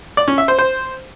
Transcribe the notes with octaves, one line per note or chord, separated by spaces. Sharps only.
D5
C#4
E5
C5
C5